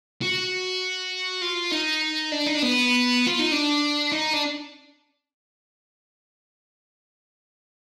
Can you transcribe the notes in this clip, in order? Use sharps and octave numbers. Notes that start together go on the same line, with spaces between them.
F#4
F4
D#4
D4
D#4
D4
B3
F4
D#4
D4
D#4
D4